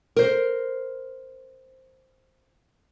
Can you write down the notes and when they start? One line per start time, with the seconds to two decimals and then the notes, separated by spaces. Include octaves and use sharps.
0.16 A#4 C5